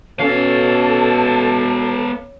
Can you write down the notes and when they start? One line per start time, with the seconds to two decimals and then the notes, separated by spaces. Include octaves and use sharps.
0.19 B2 B3 C#4 A4 F5 A5